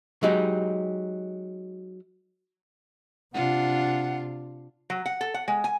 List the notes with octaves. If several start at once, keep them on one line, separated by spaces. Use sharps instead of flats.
F#3 G#3 D#4 G4
C3 D4 F4 F#5
F#3
F#5
A4
F#5
G#3
G#5